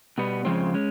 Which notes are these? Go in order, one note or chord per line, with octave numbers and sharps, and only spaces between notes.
B2 G3 B3
F2 C#3 F3 G#3 C4
G#3 C#4